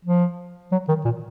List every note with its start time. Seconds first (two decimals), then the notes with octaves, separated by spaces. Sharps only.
0.05 F3
0.72 F#3
0.88 D#3
1.05 A#2